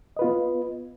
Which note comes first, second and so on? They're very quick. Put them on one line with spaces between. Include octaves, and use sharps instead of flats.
D#5 B4 F4 B3